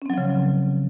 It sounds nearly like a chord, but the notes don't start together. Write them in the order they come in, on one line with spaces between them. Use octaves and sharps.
C#4 C4 F#3 F3 C#3